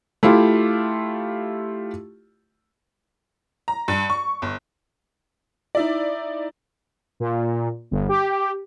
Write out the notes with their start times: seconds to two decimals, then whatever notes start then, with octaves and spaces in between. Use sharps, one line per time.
0.23 A3 E4 F4 G4
3.68 A#5
3.88 G2
4.10 C#6
4.42 G1
5.75 D#4 E4 D5
7.20 A#2
7.91 G1
8.09 G4